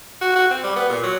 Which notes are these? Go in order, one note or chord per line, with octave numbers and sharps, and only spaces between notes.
F#4
F#4
C4
G3
B3
A#2
F#3